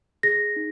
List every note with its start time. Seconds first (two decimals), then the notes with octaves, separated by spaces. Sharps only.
0.23 G#4 A#6
0.56 D#4